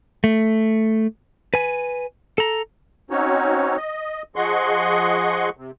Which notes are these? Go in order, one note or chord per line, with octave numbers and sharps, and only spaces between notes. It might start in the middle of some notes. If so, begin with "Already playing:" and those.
A3
B4 G#5
A4 A#5
C4 C#4 D#4 F#4 C#5
D#5
F3 G#4 D#5 F#5 C6 C#6
C3